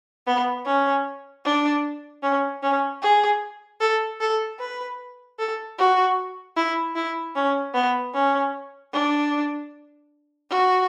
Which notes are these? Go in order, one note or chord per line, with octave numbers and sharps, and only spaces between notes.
B3
C#4
D4
C#4
C#4
G#4
A4
A4
B4
A4
F#4
E4
E4
C#4
B3
C#4
D4
F#4